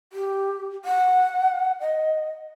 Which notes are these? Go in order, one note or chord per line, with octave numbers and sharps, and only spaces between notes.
G4
F#5
D#5